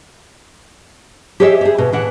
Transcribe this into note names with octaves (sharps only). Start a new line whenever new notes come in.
G4 G#4 C5 C#5 D#5 E5
G4 G#4
B2
A2 E3 F#5